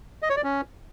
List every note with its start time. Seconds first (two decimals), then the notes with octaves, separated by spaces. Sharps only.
0.22 D#5
0.29 C#5
0.37 D5
0.44 C#4